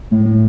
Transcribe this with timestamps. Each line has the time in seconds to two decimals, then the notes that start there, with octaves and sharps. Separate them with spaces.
0.11 A2
0.26 A2